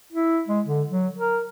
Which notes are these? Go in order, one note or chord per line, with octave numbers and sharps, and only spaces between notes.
E4
G#3
D3
F#3
A#4